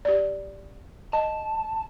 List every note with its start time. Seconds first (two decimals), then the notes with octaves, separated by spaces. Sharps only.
0.05 G4 D5
1.13 D#5 A5